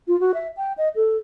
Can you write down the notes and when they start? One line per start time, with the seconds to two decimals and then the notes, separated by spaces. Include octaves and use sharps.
0.08 F4
0.20 F#4
0.34 E5
0.57 G5
0.77 D#5
0.95 A4